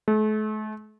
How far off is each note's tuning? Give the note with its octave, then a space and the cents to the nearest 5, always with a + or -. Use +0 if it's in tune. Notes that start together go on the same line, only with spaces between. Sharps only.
A3 -40